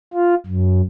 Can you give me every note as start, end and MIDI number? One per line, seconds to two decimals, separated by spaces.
0.14 0.35 65
0.46 0.81 42